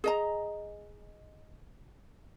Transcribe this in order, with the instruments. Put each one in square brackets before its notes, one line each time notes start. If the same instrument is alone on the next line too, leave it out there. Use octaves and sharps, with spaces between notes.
[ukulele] G#4 D#5 A#5